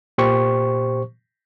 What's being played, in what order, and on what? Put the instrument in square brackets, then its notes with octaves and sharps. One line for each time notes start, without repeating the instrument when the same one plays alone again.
[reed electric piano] A#2 G4 C5 C#6